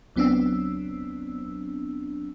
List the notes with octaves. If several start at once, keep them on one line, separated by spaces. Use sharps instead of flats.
C#2 F#3 B3 C4 D4 E6